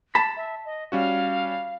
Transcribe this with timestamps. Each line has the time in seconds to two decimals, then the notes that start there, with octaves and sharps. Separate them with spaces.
0.15 A5 B5
0.36 E5
0.65 D#5
0.92 G3 C#4 F#4 F5